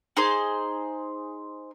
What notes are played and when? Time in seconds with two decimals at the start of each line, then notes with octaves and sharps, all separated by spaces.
0.17 D#4 G#4 C5 C6